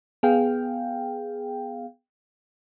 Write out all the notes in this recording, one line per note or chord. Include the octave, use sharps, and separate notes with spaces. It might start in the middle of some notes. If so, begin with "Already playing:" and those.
B3 G#4 F5 G5